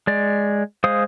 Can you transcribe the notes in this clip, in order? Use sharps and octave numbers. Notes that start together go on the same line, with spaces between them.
G#3 D5
G#3 C5 F5 D#6